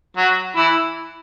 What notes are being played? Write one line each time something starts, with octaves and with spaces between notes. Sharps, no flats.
F#3 F#4
E3 E4